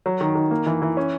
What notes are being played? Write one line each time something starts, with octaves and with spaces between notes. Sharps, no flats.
F#3
D#3
D#3
A#3
E3
E3
C#4